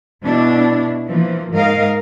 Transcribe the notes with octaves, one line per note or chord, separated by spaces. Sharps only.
B2 D4 E4
E3 F3 A#3
G#2 A#4 D#5 F5